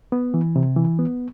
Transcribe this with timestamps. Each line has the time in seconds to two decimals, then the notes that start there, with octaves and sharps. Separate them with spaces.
0.12 B3
0.34 E3
0.56 C3
0.77 E3
0.99 B3